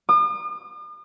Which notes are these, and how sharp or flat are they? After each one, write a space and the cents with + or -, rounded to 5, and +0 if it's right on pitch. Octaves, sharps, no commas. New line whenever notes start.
D#6 -45